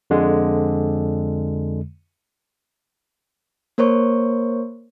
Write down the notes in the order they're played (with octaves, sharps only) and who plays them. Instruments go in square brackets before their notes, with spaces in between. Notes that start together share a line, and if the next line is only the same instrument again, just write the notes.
[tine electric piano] F2 D3 G#3
[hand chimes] A#3 A#4 C5 C#5 C#6